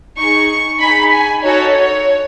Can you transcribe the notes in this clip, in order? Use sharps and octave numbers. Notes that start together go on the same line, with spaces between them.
D#4 G#4 C#6
D#4 G#4 B5
G#5
D#4 F#4 A4 C#5
C#5